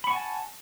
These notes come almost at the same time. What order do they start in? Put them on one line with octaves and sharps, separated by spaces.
B5 C#6 F#5 G#5 A5